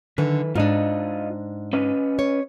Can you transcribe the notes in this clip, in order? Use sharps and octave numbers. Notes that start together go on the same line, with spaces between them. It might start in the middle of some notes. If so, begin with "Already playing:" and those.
D3 D#3 B4
G#2 D4 F4 D#5
C#4 B4 D#5
C#5